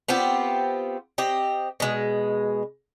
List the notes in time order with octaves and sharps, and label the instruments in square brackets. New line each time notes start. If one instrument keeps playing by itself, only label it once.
[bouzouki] B3 C4 F4 G4
C4 G4 D#5
B2 G#3